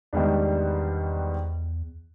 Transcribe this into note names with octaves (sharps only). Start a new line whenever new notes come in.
E2 G#2 D#3 G3 B3 D4